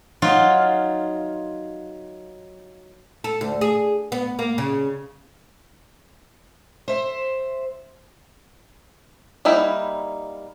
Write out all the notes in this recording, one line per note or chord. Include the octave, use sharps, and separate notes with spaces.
F#3 D#4 F4
A4
D2
G#4
B3
A#3
C#3
C5 E5
G3 A#3 D#4 E4